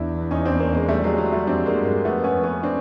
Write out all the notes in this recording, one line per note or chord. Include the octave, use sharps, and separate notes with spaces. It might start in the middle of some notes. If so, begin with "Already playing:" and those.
Already playing: E2 D4 E4
C#4 D#4
C4 D4
A#3 C4
G#3 A#3
G3 A3
F#3 G#3
F#3 G#3
G3 A3
F2 C4 D4
G#3 A#3
G2
G#3 A#3
F2 A3 B3
B3 C#4
F2
B3 C#4
C4 D4